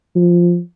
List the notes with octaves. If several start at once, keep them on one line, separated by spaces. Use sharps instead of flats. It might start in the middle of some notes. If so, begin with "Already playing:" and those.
F3